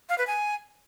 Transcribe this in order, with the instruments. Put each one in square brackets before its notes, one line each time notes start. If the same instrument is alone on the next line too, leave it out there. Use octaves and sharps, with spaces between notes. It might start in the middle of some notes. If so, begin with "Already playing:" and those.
[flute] F5
B4
G#5